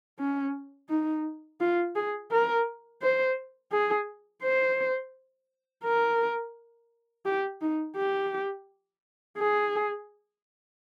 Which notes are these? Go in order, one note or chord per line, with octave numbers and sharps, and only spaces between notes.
C#4
D#4
F4
G#4
A#4
C5
G#4
C5
A#4
G4
D#4
G4
G#4